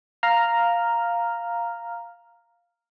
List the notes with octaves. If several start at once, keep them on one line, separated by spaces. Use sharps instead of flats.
F5 A#5 F6